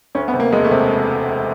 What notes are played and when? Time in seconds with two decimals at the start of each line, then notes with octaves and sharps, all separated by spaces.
0.15 D2 C#4
0.28 B3
0.34 C3
0.40 A#3
0.52 E1 G#3
0.65 A3
0.71 C3